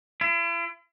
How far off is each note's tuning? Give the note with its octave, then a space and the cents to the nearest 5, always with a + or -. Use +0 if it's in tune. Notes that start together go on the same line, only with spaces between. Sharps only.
E4 +45